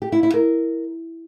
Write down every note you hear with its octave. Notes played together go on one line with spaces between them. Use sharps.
G4
E4
E4
A#4